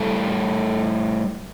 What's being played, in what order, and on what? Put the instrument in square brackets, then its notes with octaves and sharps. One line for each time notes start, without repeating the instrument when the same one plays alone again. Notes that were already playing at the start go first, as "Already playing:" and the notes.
Already playing: [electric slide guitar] A2 G3 A4